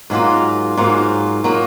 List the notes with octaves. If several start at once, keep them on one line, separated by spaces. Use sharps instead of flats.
G#2 F#3 A#3 F4
G#2 F#3 A#3 F4
F#3 A#3 F4